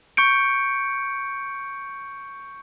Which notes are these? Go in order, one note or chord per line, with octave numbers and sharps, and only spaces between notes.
C#6 G6 C#7 D7